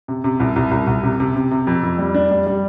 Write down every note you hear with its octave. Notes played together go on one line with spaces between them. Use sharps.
C3
C3
C2
C2
C2
C2
C3
C3
C3
C3
F2
F2
G3
D4
G3
G3